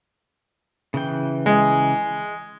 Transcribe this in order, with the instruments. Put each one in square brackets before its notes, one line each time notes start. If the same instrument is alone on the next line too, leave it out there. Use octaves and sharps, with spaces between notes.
[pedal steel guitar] C#3 E3 G5
[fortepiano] G#3